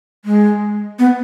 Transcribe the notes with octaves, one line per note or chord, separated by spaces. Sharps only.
G#3
B3